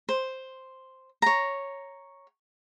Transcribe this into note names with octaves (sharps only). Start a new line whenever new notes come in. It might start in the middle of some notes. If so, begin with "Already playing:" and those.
C5
C#5 A#5